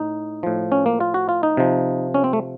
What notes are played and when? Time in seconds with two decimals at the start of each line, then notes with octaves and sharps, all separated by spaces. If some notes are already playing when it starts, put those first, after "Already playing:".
Already playing: A2 D#4
0.43 A2 F3
0.72 C#4
0.86 A#3
1.00 F4
1.14 F#4
1.29 F4
1.43 D#4
1.57 C3 F3
2.14 C#4
2.24 C4
2.33 A3